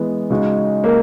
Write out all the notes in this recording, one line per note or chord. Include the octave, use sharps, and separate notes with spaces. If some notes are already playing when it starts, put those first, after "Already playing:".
Already playing: E3 G#3 B3
C#3 G#3 D#4 F#4
A#3